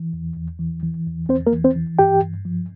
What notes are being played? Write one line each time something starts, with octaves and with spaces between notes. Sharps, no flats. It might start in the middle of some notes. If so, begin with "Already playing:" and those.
Already playing: E3
E2
E2
E3
E3
E2
E2 C4 C5
A#3 A#4
E3
C4 C5
E3
G2 G4 G5
G2
F3